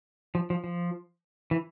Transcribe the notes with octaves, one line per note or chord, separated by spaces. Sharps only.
F3
F3
F3
E3